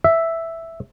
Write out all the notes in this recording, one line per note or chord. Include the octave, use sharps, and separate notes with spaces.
E5